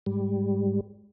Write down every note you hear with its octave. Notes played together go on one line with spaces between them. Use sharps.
G#2 G3